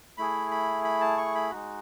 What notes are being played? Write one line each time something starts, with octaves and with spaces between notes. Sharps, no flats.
A3 E4 G#4 B5
B5
B5
A5
C#6
B5
G#3 D#4 F#4